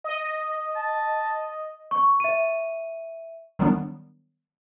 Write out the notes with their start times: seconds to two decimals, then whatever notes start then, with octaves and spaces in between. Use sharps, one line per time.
0.04 D#5
0.76 A5
1.91 C#6
2.20 E5 D#7
3.59 D#3 F#3 G3 B3 D4